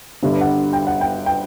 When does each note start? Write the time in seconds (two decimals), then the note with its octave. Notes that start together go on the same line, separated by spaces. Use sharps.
0.23 G1 G2 D3 G3
0.41 F#5
0.73 G5
0.87 F#5
1.01 G5
1.26 G5